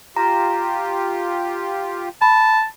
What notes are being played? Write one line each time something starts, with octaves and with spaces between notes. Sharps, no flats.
F4 G4 A#5
A5 B5